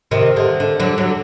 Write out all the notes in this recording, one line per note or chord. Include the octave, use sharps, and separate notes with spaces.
C3 D#3
D3
D3
D3 F#3
D3 F#3